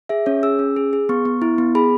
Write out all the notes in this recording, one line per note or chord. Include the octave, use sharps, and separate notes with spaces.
G#4 E5
C#4 C#5
G#4 E6
C#4
G#4
G#4
B3 C#6
B3
E4
B3
G#4 B5